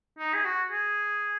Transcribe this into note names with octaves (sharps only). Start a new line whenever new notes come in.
D#4
G#4
F#4
G#4